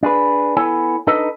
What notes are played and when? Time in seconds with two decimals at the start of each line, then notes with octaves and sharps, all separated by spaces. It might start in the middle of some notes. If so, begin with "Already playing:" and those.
0.03 D4 G#4 B4
0.57 B3 E4 A4 C#5 G#5
1.07 D4 D#4 A4 B4 D#5